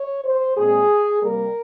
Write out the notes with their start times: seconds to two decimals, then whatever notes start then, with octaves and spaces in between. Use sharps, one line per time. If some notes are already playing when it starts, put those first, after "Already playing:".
Already playing: C#5
0.25 C5
0.57 A#2 G#3 C4 G#4
1.22 C3 G3 A#3 A#4